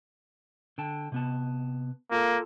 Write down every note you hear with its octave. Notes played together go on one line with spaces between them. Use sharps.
D3 G5 A5
C3 B3 A5
A#3 F4 A4